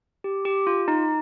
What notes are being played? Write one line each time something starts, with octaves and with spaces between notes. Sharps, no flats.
G4
G4
F4
D#4